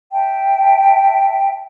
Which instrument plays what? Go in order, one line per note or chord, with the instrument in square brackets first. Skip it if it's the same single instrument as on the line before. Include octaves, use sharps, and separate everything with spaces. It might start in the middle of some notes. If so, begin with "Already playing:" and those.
[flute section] E5 G5 A5